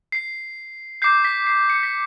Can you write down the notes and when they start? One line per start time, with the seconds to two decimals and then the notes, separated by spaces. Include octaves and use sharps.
0.12 C7
1.02 D6 G6 C7
1.25 B6
1.47 C7
1.70 C#7
1.83 B6